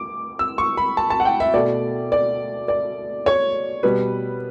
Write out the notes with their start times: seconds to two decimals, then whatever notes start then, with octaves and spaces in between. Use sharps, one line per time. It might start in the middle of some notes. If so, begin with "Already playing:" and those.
Already playing: D6
0.39 E6
0.58 C#6
0.77 B5
0.97 A5
1.10 A5
1.20 F#5
1.25 G5
1.40 E5
1.54 B2 A3 D5
2.12 D5
2.68 D5
3.26 C#5
3.83 B2 G3 B3 B4